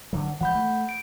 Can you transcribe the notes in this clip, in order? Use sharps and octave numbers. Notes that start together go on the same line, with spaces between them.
D3 E3 F#3
E3 F3 G#3 F#5 B5 G6
A3
D7